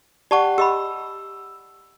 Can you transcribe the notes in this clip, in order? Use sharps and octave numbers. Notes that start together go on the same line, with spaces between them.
G4 D5 F#5 A5 C#6
G4 D#5 B5 E6